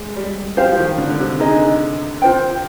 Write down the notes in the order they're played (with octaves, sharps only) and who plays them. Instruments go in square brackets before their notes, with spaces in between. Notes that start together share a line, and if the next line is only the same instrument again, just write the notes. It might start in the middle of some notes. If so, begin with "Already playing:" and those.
Already playing: [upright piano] G#3
G3
[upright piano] F3 [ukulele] G4 C5 F5
[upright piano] F3
D#3
D3
D3
C3
[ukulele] D#4 G#4 D#5
F4 C5 G5